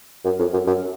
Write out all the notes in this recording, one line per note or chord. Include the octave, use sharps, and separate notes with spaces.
F#2
F2
F#2
F#2